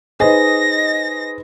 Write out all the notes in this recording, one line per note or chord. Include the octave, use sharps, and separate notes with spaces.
D#4 G#4 B4 C5 D#5 A#6